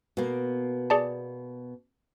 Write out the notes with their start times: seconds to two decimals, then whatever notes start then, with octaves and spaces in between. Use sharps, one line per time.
0.17 B2 A#3
0.90 G#4 D5 A5